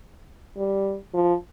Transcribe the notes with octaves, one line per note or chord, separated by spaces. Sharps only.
G3
F3